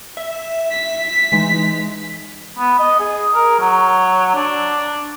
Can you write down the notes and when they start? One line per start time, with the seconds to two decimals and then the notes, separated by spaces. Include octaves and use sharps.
0.17 E5
0.71 B6
1.32 E3 G#3 D#4
2.59 B3
2.80 D#5
3.00 G#4
3.35 A#4
3.60 F#3
4.35 D4